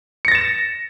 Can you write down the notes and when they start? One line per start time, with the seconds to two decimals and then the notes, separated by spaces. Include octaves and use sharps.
0.25 C#7
0.28 A#6
0.32 A6
0.35 E7